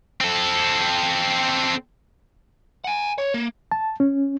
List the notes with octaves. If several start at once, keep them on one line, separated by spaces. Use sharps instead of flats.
C4 A4
F#5 G#5
C#5
A#3
A5
C#4